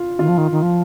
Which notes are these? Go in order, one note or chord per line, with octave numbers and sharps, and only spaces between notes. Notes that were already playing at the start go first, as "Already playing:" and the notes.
Already playing: F4
D#3 F4
F3
D#3
D#3
F3